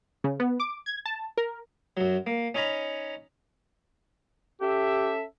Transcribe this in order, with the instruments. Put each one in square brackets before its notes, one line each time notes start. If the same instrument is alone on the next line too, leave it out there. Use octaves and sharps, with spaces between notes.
[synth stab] C#3
B3
D6
G#6
A5
A#4
[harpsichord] F#2 F#3
A#3
C#4 D#4 C#5 A#5 B5
[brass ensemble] C#4 A4 E5 [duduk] G4